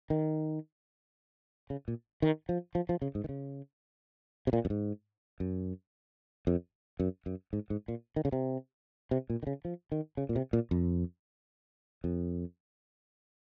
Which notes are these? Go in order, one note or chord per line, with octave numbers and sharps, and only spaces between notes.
D#3
C#3
A#2
D#3
F3
F3
F3
C#3
G#2
D#3
C#3
C3
A#2
F#2
G#2
F#2
F2
F#2
F#2
G#2
G#2
A#2
D#3
C#3
C3
C3
A#2
D#3
C#3
F3
D#3
C#3
A#2
C3
A#2
F2
F2